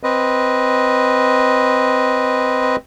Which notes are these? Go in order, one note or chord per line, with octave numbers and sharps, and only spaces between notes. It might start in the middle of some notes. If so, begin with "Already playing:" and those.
C4 B4 D#5